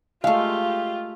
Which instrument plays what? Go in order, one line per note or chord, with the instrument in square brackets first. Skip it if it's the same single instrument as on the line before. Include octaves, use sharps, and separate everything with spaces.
[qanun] G#3 A3 [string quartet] F4 G4 [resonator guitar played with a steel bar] F5